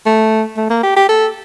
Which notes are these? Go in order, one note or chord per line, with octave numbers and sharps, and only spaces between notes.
A3
A3
A#3
G4
G4
A4